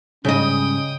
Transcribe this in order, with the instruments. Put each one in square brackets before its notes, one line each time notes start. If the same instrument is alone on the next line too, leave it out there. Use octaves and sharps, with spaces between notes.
[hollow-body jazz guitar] G#2 G3 [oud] C#3 D#5 [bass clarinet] C#4 [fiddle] G5 D#6